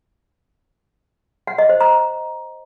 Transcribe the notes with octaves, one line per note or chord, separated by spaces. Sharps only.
F#5
D#5
C5
A#5